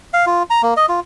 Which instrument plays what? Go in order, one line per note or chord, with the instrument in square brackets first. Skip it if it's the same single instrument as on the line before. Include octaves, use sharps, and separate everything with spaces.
[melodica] F5
F4
A#5
A#3
D#5
F4